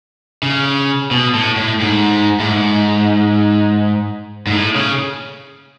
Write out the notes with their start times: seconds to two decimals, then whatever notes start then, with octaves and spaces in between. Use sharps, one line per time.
0.43 C#3
1.11 B2
1.35 A2
1.56 A2
1.80 G#2
2.40 A2
2.48 G#2
4.47 G#2
4.53 A2
4.76 C#3